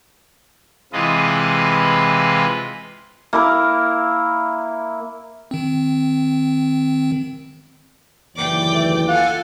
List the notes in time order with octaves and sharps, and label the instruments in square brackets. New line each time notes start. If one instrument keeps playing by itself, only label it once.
[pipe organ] C3 E3 G#3 F4 B4 D#5
[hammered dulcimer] A#3 E4 A#4
[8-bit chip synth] D#3 C4
[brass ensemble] F#1 D#2 E3 [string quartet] D5 G5 D6
[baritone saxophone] A3
[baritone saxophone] F4 [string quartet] A4 G#5 [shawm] F#5